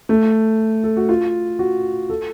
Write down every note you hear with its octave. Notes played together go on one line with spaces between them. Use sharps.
A3
A4
F#4
F4
F#4
A4